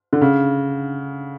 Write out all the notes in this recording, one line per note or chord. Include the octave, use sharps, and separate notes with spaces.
D3
C#3